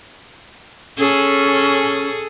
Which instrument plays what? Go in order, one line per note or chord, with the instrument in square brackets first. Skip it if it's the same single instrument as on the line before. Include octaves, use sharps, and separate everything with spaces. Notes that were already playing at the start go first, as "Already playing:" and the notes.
[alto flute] C#4 [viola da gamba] G#4 A4